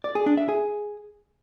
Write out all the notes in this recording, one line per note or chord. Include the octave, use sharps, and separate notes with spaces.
D5
G#4
D4
E5
G#4